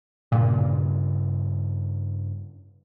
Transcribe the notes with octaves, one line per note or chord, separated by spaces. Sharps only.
G2 A#2 C#3